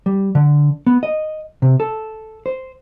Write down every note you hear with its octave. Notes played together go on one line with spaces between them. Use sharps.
G3
D3
B3
D#5
C3
A4
C5